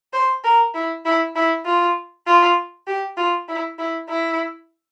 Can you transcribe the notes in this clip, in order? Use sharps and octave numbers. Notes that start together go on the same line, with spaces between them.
C5
A#4
E4
E4
E4
F4
F4
G4
F4
E4
E4
E4